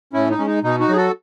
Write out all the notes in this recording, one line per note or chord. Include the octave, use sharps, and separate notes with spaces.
A2 C#4 E4
D#4
G#3 C#4
D#4
B2 D#4
D#4 F#4
F#3 G#4
F#4 A4